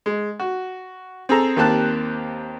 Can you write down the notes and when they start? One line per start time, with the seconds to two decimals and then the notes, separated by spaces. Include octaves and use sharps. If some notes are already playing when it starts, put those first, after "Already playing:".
0.06 G#3
0.40 F#4
1.29 C4 G#4 A4 A#5
1.56 D#2 A#3 C4 G4 A5 F#6